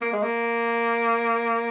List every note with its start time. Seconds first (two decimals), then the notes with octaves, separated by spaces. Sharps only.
0.01 A#3
0.13 G#3
0.23 A#3